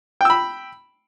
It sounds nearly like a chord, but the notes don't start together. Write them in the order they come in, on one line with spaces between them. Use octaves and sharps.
G5 E6 B5